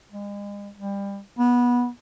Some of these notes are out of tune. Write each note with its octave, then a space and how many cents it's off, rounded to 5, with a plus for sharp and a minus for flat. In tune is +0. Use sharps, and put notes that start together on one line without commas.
G#3 -40
G3 +25
B3 -15